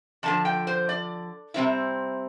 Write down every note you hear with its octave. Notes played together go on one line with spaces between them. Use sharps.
F2 D3 F3 A5
G5
C5
D5
C3 G3 C4 E4